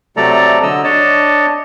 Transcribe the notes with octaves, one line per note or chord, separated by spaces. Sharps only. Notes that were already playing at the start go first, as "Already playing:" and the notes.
C3 F#3 A3 A4 D5 A#5
D3 F#3 D#5 E6
D4 C#5 D#5 A5